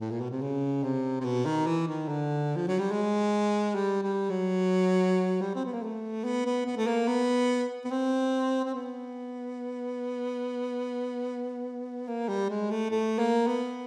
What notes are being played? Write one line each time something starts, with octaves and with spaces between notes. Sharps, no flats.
A2
A#2
B2
C3
C#3
C3
C3
B2
D#3
E3
D#3
D3
F3
F#3
G3
G#3
G3
G3
F#3
G3
C4
B3
A#3
A3
B3
B3
B3
A3
A#3
B3
B3
C4
C4
B3
A#3
G3
G#3
A3
A3
A#3
B3